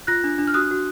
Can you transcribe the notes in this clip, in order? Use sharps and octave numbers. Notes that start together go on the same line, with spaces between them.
F4 F#6 A#6
D4
D4
F6
F#4 D#6 F#6
F#4